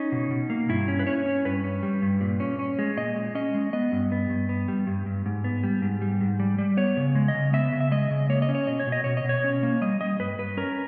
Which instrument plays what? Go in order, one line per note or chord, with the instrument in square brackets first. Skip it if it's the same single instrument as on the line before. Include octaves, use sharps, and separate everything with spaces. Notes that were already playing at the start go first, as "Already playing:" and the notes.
Already playing: [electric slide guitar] C#4 D#4
B2
B2
A#3
G2 E4
C#4
B4
C#4 C#5
C#4
G2 B4
C#4
G3
G2
A#2
C#4
C#4
G#3
A#2 D#5
G#3
C#4 D#5
G#3
B3 D#5
G2
B3
G2
B3
G3
G2
G2
G#2
B3
G3
G#2
G3
G#2
G3
G3
B3 C#5
C#3
G#3
D#5
C#3
B3 E5
C#3
E5
G#3 D#5
C#3
A#3 C#5
D#5
C#4
C#5
B2 D#5
C#5
B2
D#5
B2 C#5
D#5
B2
C#5
C#4
A#3
G3 D#5
G3 D#5
G2 B4
G2 B4
C#4 A#4